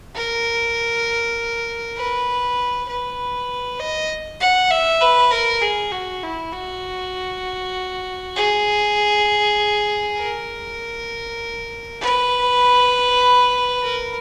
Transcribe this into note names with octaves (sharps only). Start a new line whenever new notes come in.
A#4
B4
B4
D#5
F#5
E5
B4
A#4
G#4
F#4
E4
F#4
G#4
A#4
B4
A#4